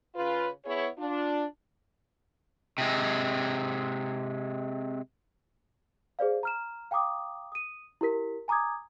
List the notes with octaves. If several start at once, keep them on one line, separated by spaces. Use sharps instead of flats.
C#3 F4 B4
B3 E4 G#4 C#5
D4 F4
C3 G#3
G#4 C5 D5 F5
A#5 F6 E7
F5 G5 A#5 D6 D#6
D#6 D#7
E4 G4 A#4 B6
G#5 A#5 D6 D#6 G#6